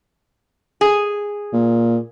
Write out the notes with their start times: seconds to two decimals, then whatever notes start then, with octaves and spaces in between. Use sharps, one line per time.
0.81 G#4
1.53 A#2